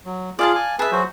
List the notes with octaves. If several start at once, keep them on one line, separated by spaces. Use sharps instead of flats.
F#3
F4 G#4 D5 F5 A5
G#5
G#4 B4 E5 A5
F#3 F#4 C5